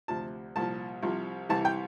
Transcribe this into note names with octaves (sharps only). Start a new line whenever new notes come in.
D2 C3 F3 A5
C2 A#2 F3 A5
C2 C3 F3
C2 C3 E3 A5
G5